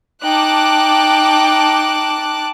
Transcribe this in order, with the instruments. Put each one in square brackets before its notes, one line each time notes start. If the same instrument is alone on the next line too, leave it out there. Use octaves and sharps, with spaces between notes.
[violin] D#4 G5 [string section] A5 D6 F#6